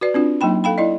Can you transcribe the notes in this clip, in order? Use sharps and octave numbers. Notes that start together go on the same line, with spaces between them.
F#4 B4 D5
C4 D4 F4
F#3 A#3 D#4 G5 B5
A4 F5 G5 B5
E4 D5 D#5